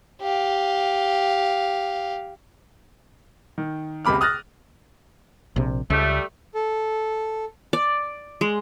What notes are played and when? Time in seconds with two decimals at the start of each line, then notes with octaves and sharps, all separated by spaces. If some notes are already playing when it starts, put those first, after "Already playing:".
0.22 G4 F5
3.58 D#3
4.05 F1 C#2 C3 B5 D6 F6
4.21 D#6 F6 F#6 A6 A#6
5.56 A#1 C3
5.90 C#2 G3 A3
6.55 A4
7.73 D5
8.41 G#3